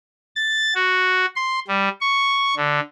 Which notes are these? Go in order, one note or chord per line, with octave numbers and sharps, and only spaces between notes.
A6
F#4
C6
G3
C#6
D3